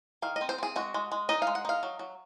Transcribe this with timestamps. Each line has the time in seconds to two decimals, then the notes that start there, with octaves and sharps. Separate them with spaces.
0.22 D#3 F5
0.36 D#5
0.41 C4
0.49 C5
0.58 C4 G#4
0.76 G#3 F#4
0.94 G#3
1.12 G#3
1.29 D#4 D#5
1.42 F5
1.47 G#3
1.55 F#5
1.65 D#4 F5
1.83 F#3
1.99 F#3